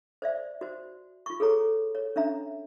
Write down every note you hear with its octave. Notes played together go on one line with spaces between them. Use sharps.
C5 D5 E5
F#4 C5
F4 C#6
G#4 A4 C#5 A#5
C#5
C#4 D4 E5 A#5